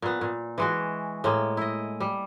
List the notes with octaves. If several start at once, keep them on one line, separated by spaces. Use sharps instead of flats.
A#2 B3
A#2
E3 G#3 F#4
A2 G#3 A#3
E4 D#5
G3